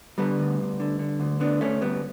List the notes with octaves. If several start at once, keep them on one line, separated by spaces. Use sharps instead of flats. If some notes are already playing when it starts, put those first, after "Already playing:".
D3 G3 B3
D2
D2
D3
D3
D2
D3 B3 D4
D2 A3 C#4
D2 G3 B3